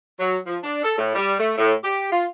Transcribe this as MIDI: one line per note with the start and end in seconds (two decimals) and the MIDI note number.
0.19 0.36 54
0.45 0.56 53
0.63 0.78 62
0.83 0.93 69
0.98 1.11 45
1.13 1.33 55
1.38 1.53 57
1.57 1.73 45
1.83 2.07 67
2.10 2.24 65